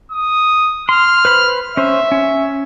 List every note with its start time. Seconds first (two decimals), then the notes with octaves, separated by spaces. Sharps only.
0.11 D#6
0.89 C6 F6
1.25 B4 C5 B5
1.77 C#4 C5 E5
2.12 C#4